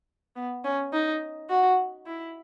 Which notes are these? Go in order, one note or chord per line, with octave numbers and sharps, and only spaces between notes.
B3
C#4
D#4
F#4
E4